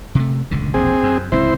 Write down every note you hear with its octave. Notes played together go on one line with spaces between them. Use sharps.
C3 A3
D#1 C#2 D3
E1 A#1 C4 G#4
F#2
D1 C#2 C4 E4 C5